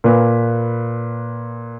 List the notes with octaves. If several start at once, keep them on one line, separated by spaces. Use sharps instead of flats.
A#2 B4